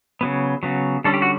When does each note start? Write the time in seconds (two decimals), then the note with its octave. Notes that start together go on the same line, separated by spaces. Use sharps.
0.21 C#3 F#3 B3
0.63 C#3 F#3 B3
1.04 D3 G3 C#4 A4
1.14 G4
1.22 F#4